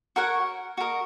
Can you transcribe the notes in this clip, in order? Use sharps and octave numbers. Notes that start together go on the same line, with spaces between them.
F#4 A#4 C#5 F#5
F#4 A#4 D#5